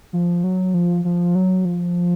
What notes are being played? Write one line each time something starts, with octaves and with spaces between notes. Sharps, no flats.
F3
F#3
F3
F3
F#3
F3